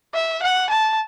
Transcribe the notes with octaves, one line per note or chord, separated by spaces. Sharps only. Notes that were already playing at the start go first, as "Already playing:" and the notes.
E5
F#5
A5